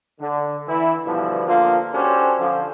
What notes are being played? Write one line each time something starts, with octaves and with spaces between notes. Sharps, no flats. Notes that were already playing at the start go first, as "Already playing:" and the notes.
D3
E3 E4
G2 B2 D3 E3 F3
D3 F3 A#3 F4
C#4 D4 F#4 G4 A4 C5
D3 F3